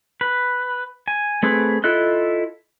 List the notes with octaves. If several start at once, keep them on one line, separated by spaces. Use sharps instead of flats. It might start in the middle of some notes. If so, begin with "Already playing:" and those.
B4
G#5
A3 C4 G#4 B4
E4 F4 A4 D#5 F#6